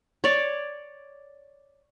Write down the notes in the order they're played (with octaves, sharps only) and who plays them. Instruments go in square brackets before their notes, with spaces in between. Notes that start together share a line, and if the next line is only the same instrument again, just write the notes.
[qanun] C#5 D5